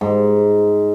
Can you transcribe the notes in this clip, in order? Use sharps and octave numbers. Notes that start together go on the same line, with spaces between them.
G#2